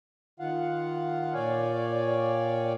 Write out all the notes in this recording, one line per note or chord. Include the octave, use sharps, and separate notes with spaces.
D#3 F4 F5 F#5
A#2 C#5 D5 F5 G5 G#5